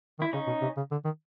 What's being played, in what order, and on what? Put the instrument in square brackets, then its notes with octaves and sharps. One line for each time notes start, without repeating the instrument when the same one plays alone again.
[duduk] D#3
[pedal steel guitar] E4
[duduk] C#3 [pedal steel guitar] C#4 D#4
[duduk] B2
C3
C#3
D3
D#3